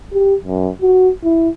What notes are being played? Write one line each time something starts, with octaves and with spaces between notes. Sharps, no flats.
G4
F#2
F#4
E4